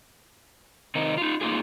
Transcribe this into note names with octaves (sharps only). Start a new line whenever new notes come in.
C3 D#3 C4 D#4 A#4
D#4 F4
A#3 D#4 F4 G#4